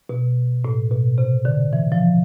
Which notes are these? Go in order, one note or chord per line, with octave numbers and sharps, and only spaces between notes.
B2
A2
B2
C3
D3
E3
F3